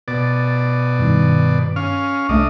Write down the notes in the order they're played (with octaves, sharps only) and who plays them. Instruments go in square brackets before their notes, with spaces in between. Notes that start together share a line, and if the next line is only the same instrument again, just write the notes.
[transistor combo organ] B2 D5 [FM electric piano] A6
[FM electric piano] G2 D#3
[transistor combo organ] C#4 F5
[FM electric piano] C2 A3 E5 [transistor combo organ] D4 D#5